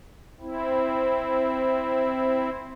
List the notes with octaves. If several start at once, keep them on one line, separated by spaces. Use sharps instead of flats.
C4 E4